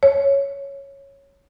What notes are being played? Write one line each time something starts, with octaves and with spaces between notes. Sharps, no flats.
C#5